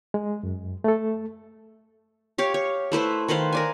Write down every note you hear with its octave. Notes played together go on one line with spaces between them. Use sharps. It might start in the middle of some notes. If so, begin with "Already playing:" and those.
G#3
F#2
A3 A4
G4 C#5 F5
C#5
A3 E4 B4 C5
D#3 B4 C5 F5
A#4 D5 G#5